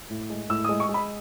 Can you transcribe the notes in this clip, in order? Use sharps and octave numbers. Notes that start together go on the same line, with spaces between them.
A2
G#3
A2 E6
D#6
G#3
C#6
G#3
B5